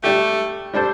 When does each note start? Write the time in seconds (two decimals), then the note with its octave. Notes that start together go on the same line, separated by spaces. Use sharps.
0.04 G3 A3 D4 G4
0.73 G3 D4 A4 C5